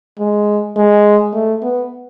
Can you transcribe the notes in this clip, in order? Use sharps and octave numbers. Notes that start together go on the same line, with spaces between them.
G#3
G#3
A3
B3